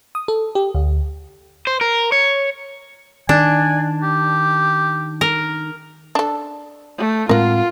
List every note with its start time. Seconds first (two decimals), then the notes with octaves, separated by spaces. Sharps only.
0.15 D#6
0.28 A4
0.55 G4
0.75 D2
1.67 C5
1.81 A#4
2.12 C#5
3.29 D#3 D4 G#5
4.03 G4
5.21 A#4
6.15 D4 A4
6.98 A3
7.29 A2 G#3 C4 F4 A#4 F#5